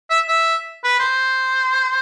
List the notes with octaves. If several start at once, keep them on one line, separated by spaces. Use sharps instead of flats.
E5
E5
B4
C5